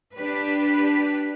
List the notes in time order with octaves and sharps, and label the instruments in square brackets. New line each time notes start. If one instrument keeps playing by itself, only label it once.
[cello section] D4 G4 B4